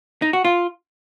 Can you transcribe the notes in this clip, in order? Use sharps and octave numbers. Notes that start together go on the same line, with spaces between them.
D#4
F#4
F4